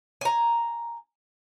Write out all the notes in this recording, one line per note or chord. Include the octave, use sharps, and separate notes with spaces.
G#5 A#5